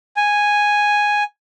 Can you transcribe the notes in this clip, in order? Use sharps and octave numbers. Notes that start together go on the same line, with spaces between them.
G#5